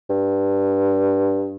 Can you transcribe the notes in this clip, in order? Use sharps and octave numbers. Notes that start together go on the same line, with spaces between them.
G2